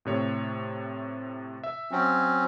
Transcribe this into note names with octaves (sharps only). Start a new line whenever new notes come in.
A2 C3 C#5
E5
F#3 C4 C#4